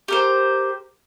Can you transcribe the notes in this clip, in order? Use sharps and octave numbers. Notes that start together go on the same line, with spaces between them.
G4 A#4 C5